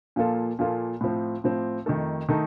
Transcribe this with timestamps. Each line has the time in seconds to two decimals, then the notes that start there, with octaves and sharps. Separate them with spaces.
0.16 A#2 F3 A#3 F4 A4
0.59 A#2 F3 A#3 F4 A4
1.01 A2 F3 C4
1.44 A2 F3 C4
1.86 F2 D#3 A3 D#4 A4
2.29 D#3 A3 D#4 A4